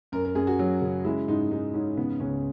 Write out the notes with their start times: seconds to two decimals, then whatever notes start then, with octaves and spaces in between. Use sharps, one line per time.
0.12 F#2 A#4
0.25 A#4
0.35 F#2 G#4
0.47 F#4
0.59 F#3
0.81 C#3
1.05 G#3 E4
1.28 G#2 D#4
1.51 G#3 D#4
1.74 G#2 C#4
1.97 C#3 B3
2.20 C#2 C#4